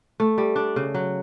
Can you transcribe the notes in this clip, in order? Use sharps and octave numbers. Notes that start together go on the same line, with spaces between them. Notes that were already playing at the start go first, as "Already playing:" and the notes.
A3
G3
D4
C#3
F#3